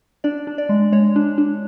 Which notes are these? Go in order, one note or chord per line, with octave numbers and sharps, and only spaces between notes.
D4 D5
D4
D5
G#3
G#3 C#5
D4
D4